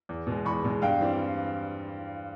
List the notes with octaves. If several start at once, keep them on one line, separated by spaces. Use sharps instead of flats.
E2
B2 G#3
E2 B5 C#6
B2 G#3
G2 F5 G5
E3 G3 C4